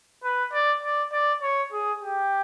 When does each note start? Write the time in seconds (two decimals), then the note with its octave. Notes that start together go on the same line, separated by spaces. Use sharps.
0.24 B4
0.53 D5
0.83 D5
1.12 D5
1.42 C#5
1.72 G#4
2.01 G4